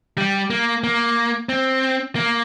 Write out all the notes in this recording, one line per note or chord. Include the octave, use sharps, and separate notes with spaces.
G3
A#3
A#3
C4
A#3